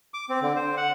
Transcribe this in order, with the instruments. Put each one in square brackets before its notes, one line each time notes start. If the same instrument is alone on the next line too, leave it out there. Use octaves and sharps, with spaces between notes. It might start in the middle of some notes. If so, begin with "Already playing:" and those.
[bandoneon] D6
C4
D3
C5
F#5